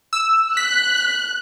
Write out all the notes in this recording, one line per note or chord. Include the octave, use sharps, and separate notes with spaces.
E6
F#6 B6